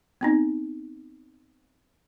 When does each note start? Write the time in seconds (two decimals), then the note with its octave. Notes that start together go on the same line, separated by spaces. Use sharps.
0.21 B3 C4 D#4